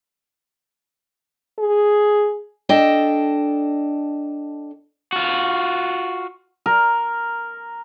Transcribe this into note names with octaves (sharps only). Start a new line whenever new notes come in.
G#4
D4 A4 D#5 G5
F4 F#4
A#4